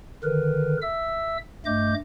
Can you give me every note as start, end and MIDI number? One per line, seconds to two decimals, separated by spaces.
0.24 0.77 50
0.24 0.77 51
0.24 0.77 70
0.24 0.77 71
0.82 1.38 76
0.82 1.38 88
1.66 1.94 43
1.66 1.94 57
1.66 1.94 75
1.66 1.94 86
1.66 1.94 91